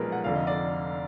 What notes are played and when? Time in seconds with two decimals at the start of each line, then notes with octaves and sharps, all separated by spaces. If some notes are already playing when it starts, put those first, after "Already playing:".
Already playing: B1 A#2 F3 G#3 G#4 A#4 B4
0.12 F#5
0.24 F1 F2 D3 F5
0.35 D#5
0.47 D5